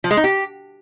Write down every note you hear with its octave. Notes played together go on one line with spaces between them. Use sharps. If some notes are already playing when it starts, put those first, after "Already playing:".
F3
G#3
D#4
G4